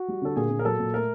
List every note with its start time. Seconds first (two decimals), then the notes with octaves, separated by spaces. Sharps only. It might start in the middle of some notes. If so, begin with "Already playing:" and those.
Already playing: F#4
0.08 G3
0.22 D3 A4
0.36 A#2 G#4
0.50 A#2
0.59 A#4
0.65 F#3 A4
0.79 A#2
0.94 A3 A#4